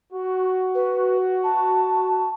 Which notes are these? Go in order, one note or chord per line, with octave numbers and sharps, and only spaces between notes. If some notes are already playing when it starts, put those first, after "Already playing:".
F#4
B4
A5